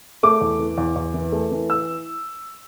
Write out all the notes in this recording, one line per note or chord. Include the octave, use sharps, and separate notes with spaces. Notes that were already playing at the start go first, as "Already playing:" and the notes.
A3 D6
E2
E3
E2
E2
E3
A3
E3
E6